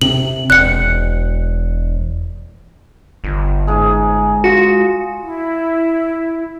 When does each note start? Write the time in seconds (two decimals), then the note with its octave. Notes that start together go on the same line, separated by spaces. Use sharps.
0.02 C3 F#7
0.50 E1 F#6 C#7
3.24 G1
3.67 G#2 G#4
4.44 F4 F#4
5.23 E4